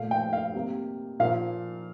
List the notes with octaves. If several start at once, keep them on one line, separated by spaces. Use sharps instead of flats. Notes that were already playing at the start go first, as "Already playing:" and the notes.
Already playing: A#2 A3 F5
G5
F5
C3 G3 A#3
A#2 F3 A#3 F5